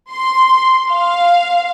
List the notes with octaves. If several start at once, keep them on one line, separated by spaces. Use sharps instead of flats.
C6
F5